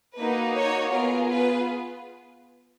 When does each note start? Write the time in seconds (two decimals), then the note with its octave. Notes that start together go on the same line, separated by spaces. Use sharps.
0.16 A#3 D#4 F#4 B4
0.54 C#5
0.92 B3 F4 G#4 A#4
1.30 B4